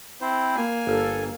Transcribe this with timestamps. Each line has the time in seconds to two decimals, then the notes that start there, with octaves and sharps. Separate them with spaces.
0.21 C4 E4 C5
0.56 A#3 G#5
0.87 G1 A4